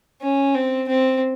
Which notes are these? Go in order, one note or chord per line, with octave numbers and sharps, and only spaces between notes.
C#4
C4
C4